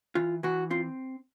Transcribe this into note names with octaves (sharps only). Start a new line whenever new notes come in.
E3 F4
E3 F#4
C4 F4